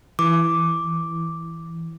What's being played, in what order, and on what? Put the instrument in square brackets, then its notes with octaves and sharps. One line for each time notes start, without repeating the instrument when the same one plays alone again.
[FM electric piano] E3 [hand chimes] D6